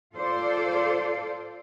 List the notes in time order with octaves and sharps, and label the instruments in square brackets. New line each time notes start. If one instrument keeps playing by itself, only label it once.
[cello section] F4 A4 C5 D5